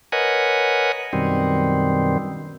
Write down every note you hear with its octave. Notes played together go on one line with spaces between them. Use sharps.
A#4 B4 C#5 D#5 F#5 G#5
F#2 B2 D#3 G3 C4